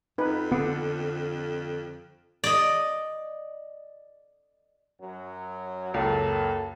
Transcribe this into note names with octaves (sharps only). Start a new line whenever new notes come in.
F2 D#4 B4
D3 B3
D5 D#5
F#2 F#3
C#2 F#2 A#3 A4